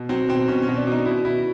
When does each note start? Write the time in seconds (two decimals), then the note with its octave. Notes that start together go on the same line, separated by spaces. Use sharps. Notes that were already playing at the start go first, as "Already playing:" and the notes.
Already playing: B2
0.09 F#3 C4
0.28 B2 C4
0.48 B2 C#4
0.62 C#4
0.68 B2
0.77 D4
0.87 B2 D#4
1.05 B2 E4
1.25 B2 E4